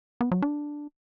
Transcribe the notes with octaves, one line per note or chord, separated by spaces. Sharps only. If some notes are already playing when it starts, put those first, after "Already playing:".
B3
F#3
D4